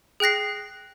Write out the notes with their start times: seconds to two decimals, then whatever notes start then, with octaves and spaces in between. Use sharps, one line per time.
0.20 G#4 G5 F#6 A#6 C7